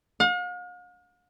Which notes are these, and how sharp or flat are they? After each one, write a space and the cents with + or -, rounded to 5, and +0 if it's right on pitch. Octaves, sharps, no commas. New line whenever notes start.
F5 +45